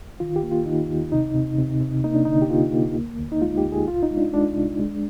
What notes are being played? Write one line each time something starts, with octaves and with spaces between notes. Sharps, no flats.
D#3 F4
G4
A#3
F4
D#3 D#4
D#2
C3 D#4
C3
C3
C3
A#3 D#4
D4
D3 D#4
G4
A#3 F4
A#3
D2
D2
D#4
G#3 F4
G4
D2
G#4
C2 F4
D#4
G#3
D4
G#3 D4
C2
G#3